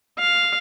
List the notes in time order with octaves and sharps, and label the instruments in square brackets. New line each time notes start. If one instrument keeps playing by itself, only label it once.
[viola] F5